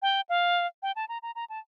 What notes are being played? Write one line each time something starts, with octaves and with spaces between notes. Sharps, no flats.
G5
F5
G5
A5
A#5
A#5
A#5
A5